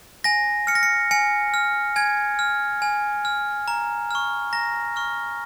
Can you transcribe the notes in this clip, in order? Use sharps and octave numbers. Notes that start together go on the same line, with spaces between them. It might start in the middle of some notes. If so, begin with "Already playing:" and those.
G#5 A#6
F6 C#7
A#6
C#7
G#5 C#7
F6
G#5 G#6
F6
G#5
F6
A#5
C#6 F6
A#5 A#6
C#6 F6